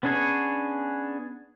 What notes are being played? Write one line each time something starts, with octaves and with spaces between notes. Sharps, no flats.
B3 C#4 D4 G#4 C#5